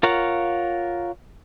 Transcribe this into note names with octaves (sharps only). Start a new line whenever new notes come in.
F4 A#4 C#5 F5 F#5